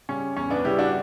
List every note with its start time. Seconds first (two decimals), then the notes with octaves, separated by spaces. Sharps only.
0.09 C#3 G3 C#4
0.37 E2 C#4
0.50 B3 D4
0.65 C#3 G3 E4 G4
0.79 D4 F#4